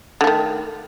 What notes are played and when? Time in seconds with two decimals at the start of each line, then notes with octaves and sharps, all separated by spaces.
0.21 D3
0.24 A3
0.27 D#3